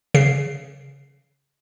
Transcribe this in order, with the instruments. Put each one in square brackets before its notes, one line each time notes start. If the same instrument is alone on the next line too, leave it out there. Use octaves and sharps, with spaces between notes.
[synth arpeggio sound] C#3 C7